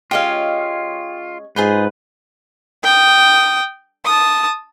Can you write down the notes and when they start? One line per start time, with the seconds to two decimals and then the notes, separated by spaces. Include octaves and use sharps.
0.11 G#3 C#4 F4 G4 D#5 F5
1.56 G#2 D#4 F4 G#4 B4
2.84 G5 D#6
4.05 A5 D#6